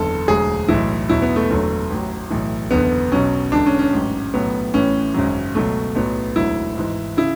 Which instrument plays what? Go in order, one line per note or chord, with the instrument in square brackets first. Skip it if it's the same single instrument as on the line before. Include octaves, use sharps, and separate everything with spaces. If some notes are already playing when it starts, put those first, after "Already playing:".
Already playing: [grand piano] F#1 E2 D3 A4
E1 D2 D3 F#3 G#4
B1 A2 E3 E4
E2 B2 F#3 E4
B3
A3
F#1 E2 D3 F#3
A1 A2 F#3
B1 A2 E3
F#1 E2 D3 B3
B1 B2 F#3 C#4
E1 E2 D3 D4
C#4
C#4
A1 G#2 F#3
B1 A2 F#3 B3
A1 A2 E3 C#4
G#1 F#2 C#3 F#3
C#2 B2 F#3 A3
B1 A2 F#3 B3
E1 D2 D3 F#3 E4
G#1 G#2 E3
C#3 E4